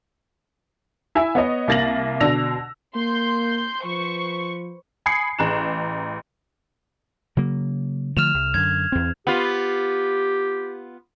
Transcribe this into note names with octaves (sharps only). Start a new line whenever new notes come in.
E4 E5 G#5
B3 C#5 D#5
C2 A#3 A6 A#6 F#7
B2 D3 D4 E6 A#6 F7
A#3 C6 G6
F3 B4 C5 C#6
G#5 B5 D#6 G#6 C7 C#7
A1 G#4 A#5 F#6 E7
C#3 F#3 A#3
D3 F3 A3 F6 E7 F7
C2
F#2 D3 G#6
E2 C4
B3 F4 G4